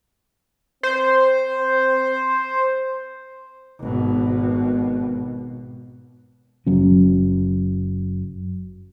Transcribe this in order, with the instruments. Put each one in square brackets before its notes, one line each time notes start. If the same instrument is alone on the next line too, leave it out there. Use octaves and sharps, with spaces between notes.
[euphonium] C4 [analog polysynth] C5
[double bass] G#1 B2
[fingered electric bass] F#1 F#3 C#4